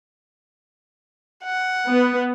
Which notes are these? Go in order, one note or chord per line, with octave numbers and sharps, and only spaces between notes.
F#5
B3